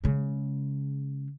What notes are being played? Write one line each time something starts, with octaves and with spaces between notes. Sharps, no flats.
C#3 G#3